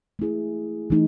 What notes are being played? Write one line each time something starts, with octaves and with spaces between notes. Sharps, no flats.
A3 E4 G#4
E3 A3 D#4